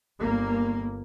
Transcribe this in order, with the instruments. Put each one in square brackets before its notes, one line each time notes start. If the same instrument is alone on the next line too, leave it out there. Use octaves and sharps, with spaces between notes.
[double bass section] G1 A#3